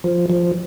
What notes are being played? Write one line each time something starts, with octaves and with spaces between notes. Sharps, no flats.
F3
F3